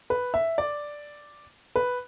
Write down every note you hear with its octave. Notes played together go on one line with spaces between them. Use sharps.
B4
E5
D5
B4